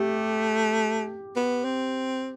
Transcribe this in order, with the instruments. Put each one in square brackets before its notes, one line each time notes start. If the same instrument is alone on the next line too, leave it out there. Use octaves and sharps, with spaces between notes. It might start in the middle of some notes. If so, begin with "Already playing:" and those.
Already playing: [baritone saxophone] A3 [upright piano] G4
[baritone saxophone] B3
C4